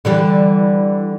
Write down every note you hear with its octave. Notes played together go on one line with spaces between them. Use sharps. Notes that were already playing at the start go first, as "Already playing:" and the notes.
D3 E3 G3